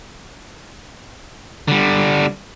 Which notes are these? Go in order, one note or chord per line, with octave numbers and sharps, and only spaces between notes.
D3 G3